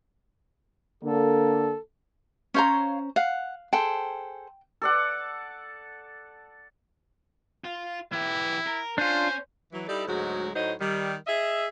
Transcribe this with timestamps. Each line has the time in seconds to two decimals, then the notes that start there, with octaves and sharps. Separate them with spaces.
1.03 D3 A#3 A4
2.54 C#4 C5 C#5 F5 A#5 C6
3.16 F5 F#5
3.73 G#4 A4 C5 G5
4.82 A4 D5 F#5
7.64 F4
8.12 E3 E4 G4
8.67 A#4
8.98 C#4 D4 F4 C5
9.73 E3 F#3
9.88 G3 D#4 E4 A4 D5
10.07 D2 G#2 F#3 G#3 F#4
10.55 A2 F#3 D#4 C5 D#5
10.80 D#3 G3
11.27 G#4 D#5 E5